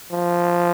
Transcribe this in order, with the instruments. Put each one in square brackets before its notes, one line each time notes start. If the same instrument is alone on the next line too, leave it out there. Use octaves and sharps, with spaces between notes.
[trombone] F3